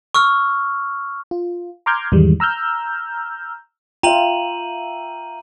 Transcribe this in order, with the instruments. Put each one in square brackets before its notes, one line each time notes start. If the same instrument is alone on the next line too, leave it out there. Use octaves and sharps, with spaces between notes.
[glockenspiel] C#6 E6 F6
[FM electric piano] F4
A#5 C6 D6 F6 G6 G#6
E2 G#2 D#3 E3 G3 G#3
A#5 E6 F6 G6
[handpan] F4 [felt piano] E5 F5 G5 [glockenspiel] A#5 D#7 F#7